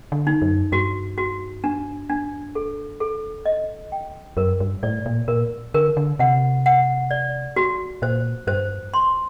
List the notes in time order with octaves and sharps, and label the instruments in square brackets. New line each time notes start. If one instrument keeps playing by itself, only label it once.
[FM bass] D3
[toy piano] D#4
[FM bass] F#2
[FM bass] G2 [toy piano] F#4
[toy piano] F#4
D4
D4
A4
A4
D#5
G5
[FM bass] F#2 [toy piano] A#4
[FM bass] G2
[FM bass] A2 [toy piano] D5
[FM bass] A#2
[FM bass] A#2 [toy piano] A#4
[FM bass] D3 [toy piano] A#4
[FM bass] D3
[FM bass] C3 [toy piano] F#5
[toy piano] F#5
D5
F#4
[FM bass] A#2 [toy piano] C5
[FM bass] G2 [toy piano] C5
[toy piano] C6